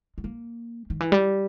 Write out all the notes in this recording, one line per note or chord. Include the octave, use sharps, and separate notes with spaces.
G#3
A#3
D#3
E3
G3